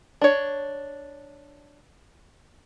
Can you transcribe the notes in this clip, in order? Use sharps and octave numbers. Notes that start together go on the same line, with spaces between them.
D4 C#5